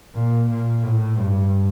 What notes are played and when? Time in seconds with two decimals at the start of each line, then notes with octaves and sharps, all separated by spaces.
0.15 A#2
0.49 A#2
0.83 A2
1.17 G2